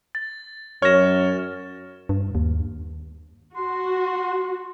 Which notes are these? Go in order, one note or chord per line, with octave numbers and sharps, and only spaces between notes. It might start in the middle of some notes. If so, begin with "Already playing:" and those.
A6
F#2 C#5 F6 A#6 E7
G2
D#2
F#4 C6